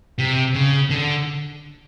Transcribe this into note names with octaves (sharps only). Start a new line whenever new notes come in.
C3
C#3
D3